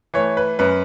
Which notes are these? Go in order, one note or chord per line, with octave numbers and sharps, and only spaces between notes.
E3 A3 C#5
B4
F#2 B4